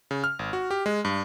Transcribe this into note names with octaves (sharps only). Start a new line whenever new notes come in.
C#3
F6
G#1
F#4
G4
G#3
G2